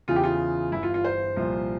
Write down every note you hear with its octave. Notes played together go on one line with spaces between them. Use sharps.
E2 C#3 E3 F4
G4
F4
G1 G2 E3 E4
F4
F4
C5
C2 A#2 F3